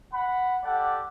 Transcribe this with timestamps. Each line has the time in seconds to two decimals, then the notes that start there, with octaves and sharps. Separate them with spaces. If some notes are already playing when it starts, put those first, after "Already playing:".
0.14 F#5 B5
0.64 G4 A4 D5 F#5